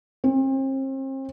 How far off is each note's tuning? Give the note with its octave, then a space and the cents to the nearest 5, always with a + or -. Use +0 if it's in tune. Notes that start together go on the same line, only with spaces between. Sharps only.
C4 +40